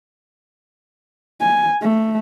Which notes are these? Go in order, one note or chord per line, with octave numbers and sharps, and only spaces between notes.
G#5
A3